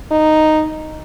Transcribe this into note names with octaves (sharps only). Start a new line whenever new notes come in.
D#4